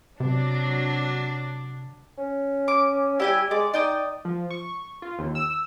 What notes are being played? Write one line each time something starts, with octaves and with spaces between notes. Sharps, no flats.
C3 F#3 D4
C#4
D6
G3 E4 G4 G#5
G#3 D5
D#4 D5 G5 D#6
F3
C#6
F4
D#2
E6